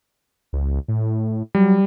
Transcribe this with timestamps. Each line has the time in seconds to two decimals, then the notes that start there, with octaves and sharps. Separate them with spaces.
0.53 C#2
0.88 A2
1.55 F#3 G3